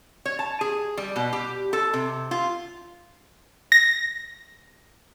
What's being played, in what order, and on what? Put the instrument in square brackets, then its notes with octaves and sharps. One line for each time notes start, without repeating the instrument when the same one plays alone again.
[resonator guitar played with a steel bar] C#5
A5
G#4
G3
B2
G4
A4
C3
F4
[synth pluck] A#6